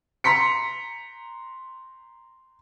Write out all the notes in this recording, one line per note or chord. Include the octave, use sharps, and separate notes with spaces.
A#5 C6 B6 C#7